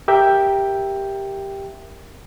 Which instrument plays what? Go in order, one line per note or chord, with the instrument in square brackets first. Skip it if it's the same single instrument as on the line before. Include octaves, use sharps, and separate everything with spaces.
[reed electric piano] G4 A#4 E5 G5 G6